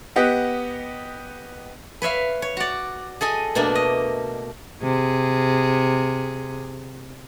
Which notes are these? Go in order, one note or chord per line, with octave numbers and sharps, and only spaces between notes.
B3 G4 D#5 F#5
B4 C#5 E5 F5
C#5
F#4 D5
G#4 A4 D#5 G#5
B2 A3 A#3 D4
D#5
C3 G#4